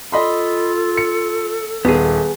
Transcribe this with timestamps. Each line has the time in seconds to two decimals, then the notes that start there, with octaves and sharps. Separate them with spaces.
0.12 F4 A4 D#5 B5 C6
0.97 C#7
1.85 D#1 B3 G#4